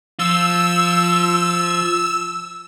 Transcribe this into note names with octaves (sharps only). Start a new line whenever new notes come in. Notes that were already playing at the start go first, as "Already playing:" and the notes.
F3 F4 E6